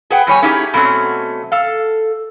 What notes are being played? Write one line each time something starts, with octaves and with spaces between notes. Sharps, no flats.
G#4 B4 F#5 G5
E2 G3 C#5 G#5
A3 C#4 D#4 E4 G4 G#4
B2 F#3 A3 C4 C#4
A4 F5